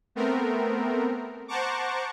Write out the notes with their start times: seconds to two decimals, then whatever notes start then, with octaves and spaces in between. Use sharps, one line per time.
0.15 A3 B3 C4 A#4
1.48 C5 F#5 A5 A#5 C#6 D6